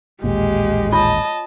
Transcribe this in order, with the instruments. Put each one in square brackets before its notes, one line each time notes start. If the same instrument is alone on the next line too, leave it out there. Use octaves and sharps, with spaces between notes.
[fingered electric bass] A1 D#2 A#2 [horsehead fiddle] G#3 [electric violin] G4
[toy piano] F4 C#5 [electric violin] D#5 A5